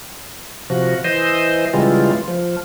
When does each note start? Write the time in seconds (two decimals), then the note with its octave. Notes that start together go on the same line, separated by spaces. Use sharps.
0.70 C3 F3 F#4
1.04 E3 C5 D#5
1.73 C#3 E3 G3 G#3 F4
2.28 F3